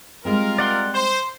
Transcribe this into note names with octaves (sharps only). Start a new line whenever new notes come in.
G3 G#3 C4 F4 A#4
D5 F#5 C6
C5 C6